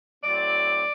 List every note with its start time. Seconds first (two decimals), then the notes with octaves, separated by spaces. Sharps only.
0.24 A2 F#3 C4 D5